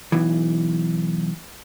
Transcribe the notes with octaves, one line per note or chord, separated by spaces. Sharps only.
B1 E3